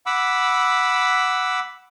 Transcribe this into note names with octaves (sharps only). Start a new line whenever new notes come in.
F#5 B5 D6 E6